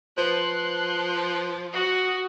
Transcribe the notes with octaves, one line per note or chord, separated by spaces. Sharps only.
F3 B4 C5 C6 F#6
F#4 D#6